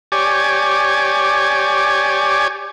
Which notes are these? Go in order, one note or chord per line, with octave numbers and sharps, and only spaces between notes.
G4 C#5 D5 G#5